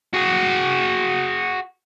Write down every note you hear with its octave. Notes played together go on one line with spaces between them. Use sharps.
F#4 G#4